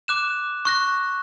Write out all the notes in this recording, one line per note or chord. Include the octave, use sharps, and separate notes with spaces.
D6 F#6 E7
C#6 F#6 A#6